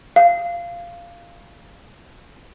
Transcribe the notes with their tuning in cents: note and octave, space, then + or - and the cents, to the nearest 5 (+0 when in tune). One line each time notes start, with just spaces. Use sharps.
F5 -15